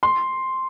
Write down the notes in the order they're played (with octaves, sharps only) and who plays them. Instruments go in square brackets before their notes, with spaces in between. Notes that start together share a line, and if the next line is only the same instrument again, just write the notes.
[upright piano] C6